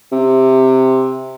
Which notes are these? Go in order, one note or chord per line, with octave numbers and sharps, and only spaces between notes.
C3